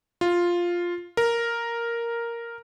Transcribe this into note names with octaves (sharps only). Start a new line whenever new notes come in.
F4
A#4